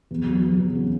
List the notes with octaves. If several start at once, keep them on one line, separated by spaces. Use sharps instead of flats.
E2
F#3
F#3
E2
C#3